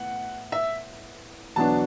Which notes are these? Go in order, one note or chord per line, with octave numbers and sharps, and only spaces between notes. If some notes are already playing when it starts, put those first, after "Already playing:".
Already playing: A2 B3 F#5
E5
E2 B2 F#3 B3 D4 A5